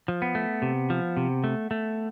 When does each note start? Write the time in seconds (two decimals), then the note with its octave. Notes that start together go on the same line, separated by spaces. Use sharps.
0.08 F3
0.22 B3
0.35 A3
0.62 C3
0.90 F3
1.17 C3
1.44 A3
1.71 A3